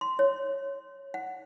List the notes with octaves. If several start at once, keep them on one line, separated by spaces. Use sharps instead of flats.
C6
C#5
F#5